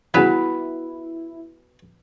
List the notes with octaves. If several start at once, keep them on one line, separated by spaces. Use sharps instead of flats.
G2 C#3 E3 B3 E4 F#4 B4 F#5